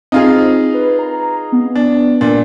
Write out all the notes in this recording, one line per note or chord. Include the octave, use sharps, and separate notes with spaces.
C4 D#4 F4 G#4
B4
A#5
B3
D4
A#2 D4